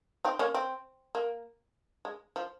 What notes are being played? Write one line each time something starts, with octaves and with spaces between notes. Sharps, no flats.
C4 D#4
A#3 C#4
C4
A#3
G#3
F3